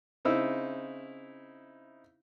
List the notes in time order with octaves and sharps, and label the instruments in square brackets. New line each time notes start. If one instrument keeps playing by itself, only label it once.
[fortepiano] C#3 C4 D#4 E4 E6